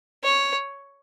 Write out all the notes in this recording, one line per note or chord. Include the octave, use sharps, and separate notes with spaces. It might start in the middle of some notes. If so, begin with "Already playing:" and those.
C#5